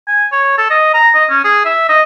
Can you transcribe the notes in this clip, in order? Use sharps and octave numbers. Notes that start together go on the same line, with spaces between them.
G#5
C#5
A4
D#5
A#5
D#5
C#4
G#4
E5
D#5